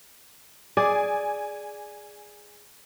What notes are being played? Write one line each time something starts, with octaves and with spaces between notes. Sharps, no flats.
G#4 D5 G#5